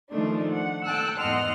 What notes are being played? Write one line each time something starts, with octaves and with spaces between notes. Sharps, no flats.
D#3 F3 G#3 A3 D4 D#4
F#5
A4 G5 A5 E6 F#6
E2 G#2 D#5 F#5 C6 F6